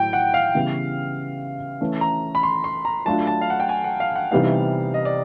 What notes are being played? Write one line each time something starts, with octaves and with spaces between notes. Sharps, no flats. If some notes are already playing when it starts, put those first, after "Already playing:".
Already playing: A2 F#3 E4 G5
F#5
F5
C#3 E3 G3 B3
E3 A3 C#4
A#5
B5
C6
C6
A#5
F#3 A3 D4 F4 A5
A5
F5
F#5
G5
G#5
F#5
F5
F#5
C3 E3 G3 B3 D#4 F5
D#5
D5